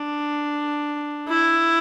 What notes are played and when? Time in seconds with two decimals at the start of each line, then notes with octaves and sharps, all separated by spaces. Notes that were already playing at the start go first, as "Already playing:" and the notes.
Already playing: D4
1.29 E4